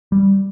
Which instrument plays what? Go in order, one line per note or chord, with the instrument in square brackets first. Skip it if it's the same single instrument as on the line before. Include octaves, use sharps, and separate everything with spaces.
[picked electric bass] G3